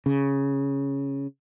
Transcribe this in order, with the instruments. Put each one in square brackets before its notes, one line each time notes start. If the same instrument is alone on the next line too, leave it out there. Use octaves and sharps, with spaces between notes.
[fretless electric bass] C#3